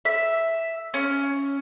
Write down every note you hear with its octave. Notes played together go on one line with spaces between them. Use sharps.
E5
C#4